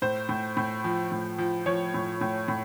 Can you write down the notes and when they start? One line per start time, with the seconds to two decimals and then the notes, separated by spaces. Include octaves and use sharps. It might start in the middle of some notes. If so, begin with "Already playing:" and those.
0.02 A2 C5
0.29 A2
0.57 A2
0.84 F3
1.12 A2
1.38 F3
1.66 F3 C#5
1.94 A2
2.21 A2
2.48 A2